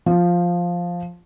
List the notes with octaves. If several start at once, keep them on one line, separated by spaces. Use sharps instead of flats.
F3